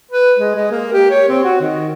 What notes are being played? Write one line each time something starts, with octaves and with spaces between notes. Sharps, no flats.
B4
G#3
G#3
A#3
G4
C#5
C4
F#4
D#3